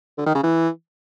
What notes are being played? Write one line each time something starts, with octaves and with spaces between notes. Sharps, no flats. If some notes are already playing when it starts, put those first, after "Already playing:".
D3
D#3
C#3
E3